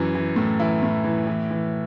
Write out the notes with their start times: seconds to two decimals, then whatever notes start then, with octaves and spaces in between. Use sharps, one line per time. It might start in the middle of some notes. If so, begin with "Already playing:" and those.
Already playing: F#2 E3
0.15 E3
0.36 A2
0.59 E3 E4
0.83 A2
1.04 E3
1.27 E3
1.51 E3